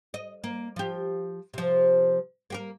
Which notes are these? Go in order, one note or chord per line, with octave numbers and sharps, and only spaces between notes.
D#5
A#3
F3 G4
C3 F3
A#3 G4 A#4